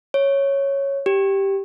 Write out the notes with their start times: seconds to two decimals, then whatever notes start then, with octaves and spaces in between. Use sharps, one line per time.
0.14 C#5
1.06 G4